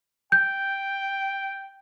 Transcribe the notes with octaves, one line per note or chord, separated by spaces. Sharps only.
G5 G6